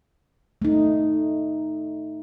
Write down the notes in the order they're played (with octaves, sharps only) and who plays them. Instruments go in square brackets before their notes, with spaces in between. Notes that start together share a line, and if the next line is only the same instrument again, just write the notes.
[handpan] A3 D#4